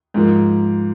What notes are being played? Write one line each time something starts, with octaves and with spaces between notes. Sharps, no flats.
G#2 F3 A#3